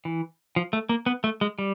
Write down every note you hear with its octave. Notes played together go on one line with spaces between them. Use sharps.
E3
F3
A3
A#3
B3
A3
G#3
G3